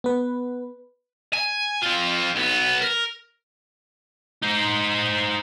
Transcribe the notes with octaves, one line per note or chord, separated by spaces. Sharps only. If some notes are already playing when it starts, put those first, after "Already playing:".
B3 B4
G#5
C4 F4
B1 B3
A#4
D#4 C5